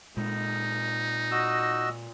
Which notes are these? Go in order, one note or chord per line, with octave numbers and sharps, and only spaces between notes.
A#2 G#3 D#4
F#4 D#5 E6